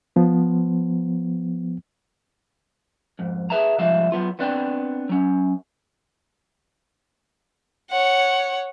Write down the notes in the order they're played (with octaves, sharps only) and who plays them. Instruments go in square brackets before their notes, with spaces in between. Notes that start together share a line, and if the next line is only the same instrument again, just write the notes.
[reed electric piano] F3 B3
[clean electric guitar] F2 G#2
G#4 B4 E5 A5 A#5
C2 G#2 F3 G3 E5 F5
F#3 B3 F4
B3 C4 D4 B4 D5 G5
F#3 C#4
[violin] C#5 F#5